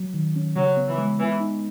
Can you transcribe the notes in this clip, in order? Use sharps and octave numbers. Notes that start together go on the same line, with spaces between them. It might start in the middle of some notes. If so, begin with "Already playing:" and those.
Already playing: F#3
D#3
C#4
C#3 F#3
B3
E3
G#3
E3 B3
D#4